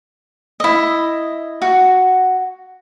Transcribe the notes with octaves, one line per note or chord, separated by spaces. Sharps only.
E4 D#5
F#4